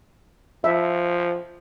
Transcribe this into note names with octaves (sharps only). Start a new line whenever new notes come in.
F3 E5